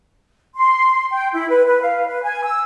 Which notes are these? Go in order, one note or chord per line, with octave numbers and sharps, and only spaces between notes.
C6
G5
E4
B4
B4
F5
B4
G#5
E6